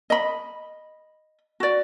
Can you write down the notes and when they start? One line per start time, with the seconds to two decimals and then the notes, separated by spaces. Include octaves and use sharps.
0.10 D#5 B5
1.60 F#4 D5